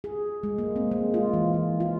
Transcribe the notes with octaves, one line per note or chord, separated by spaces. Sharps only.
G#4
G#3
A#3
C4
G#3
F4
E3
E3
F4